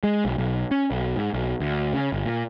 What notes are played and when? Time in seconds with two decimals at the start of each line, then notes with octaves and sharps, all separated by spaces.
0.03 G#3
0.25 B1
0.38 B1
0.71 C#4
0.91 B1
1.16 G#2
1.33 B1
1.60 D2
1.93 C#3
2.12 G1
2.26 A#2